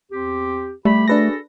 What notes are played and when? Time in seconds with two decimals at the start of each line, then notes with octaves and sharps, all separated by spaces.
0.11 E2 C4 G4
0.85 G3 A3 G4 B5
1.08 D4 F#4 G#4 A4 B4 A#6